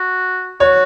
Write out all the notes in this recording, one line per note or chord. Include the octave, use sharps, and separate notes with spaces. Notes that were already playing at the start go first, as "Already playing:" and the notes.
Already playing: F#4
F#4 C#5